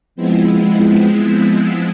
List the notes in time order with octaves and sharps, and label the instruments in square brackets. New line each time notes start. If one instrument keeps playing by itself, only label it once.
[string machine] F3 G#3 B3 C4 E4